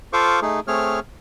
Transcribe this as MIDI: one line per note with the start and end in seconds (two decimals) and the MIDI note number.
0.13 0.40 65
0.13 0.40 69
0.13 0.40 72
0.13 0.40 77
0.13 0.40 85
0.13 0.40 86
0.42 0.60 57
0.42 0.60 63
0.42 0.60 68
0.67 1.00 57
0.67 1.00 60
0.67 1.00 68
0.67 1.00 73
0.67 1.00 89